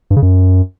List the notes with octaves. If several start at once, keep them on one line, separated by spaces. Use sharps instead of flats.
G2
C#3
F#2